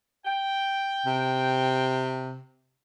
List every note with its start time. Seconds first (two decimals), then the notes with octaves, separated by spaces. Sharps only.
0.24 G5
1.06 C3